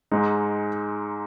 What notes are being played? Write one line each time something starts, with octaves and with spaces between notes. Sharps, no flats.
G#2 G#3 D#4